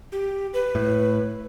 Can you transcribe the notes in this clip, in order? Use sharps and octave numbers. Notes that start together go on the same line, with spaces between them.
G4
B4
A2